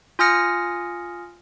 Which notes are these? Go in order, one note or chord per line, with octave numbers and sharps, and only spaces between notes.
F4 G#5 D#6 F6 A#6 C#7